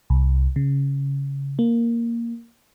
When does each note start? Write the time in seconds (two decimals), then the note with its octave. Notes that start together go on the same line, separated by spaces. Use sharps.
0.10 C2
0.56 C#3
1.59 A#3